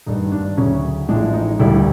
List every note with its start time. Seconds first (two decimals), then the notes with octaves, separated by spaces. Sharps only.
0.06 G#1 G2 D#3 D#4
0.32 D4
0.57 D2 C#3 F#3 C#4
1.09 A1 A2 F3 G#3 D4
1.34 D#4
1.59 E1 D2 D3 G3 E4